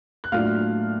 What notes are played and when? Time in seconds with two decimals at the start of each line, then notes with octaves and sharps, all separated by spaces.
0.24 F#6
0.32 A2 F#3 A#3 D4 F4 F5 F6